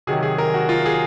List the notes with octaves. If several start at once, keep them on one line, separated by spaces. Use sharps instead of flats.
C3 D#3 F#3 G#4
G#4
A#4
F#4
F4
G#4